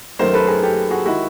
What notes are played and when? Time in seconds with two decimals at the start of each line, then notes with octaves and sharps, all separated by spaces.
0.19 F#2 D#3 F#3 A3 A#4 C5
0.34 A4 B4
0.47 G#4 A#4
0.63 G4 A4
0.91 F#4 G#4
1.05 D#3 G#3 E4 F#4